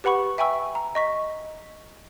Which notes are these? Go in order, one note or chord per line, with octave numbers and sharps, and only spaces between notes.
G4 B4 F#5 B5 C#6
E5 G5 G#5 B5 C#6 E6
A#5
D#5 C#6 B6